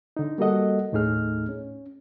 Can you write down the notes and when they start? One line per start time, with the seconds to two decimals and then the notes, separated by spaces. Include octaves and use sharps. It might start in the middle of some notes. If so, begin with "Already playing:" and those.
0.17 D3 D#4
0.38 G3 A#3 F#4 A4 D#5 F#5
0.92 D#2 A2 A3 D#4 G#4 F6
1.49 C#4